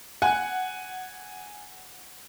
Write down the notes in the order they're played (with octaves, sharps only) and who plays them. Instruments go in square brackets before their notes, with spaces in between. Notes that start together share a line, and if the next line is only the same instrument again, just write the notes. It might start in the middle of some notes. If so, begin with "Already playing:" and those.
[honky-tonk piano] F#5 [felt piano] G#5